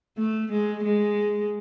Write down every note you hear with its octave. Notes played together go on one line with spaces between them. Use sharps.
A3
G#3
G#3